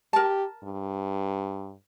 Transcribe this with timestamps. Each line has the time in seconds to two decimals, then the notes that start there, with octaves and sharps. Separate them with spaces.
0.13 G4 A#4 A5
0.64 G2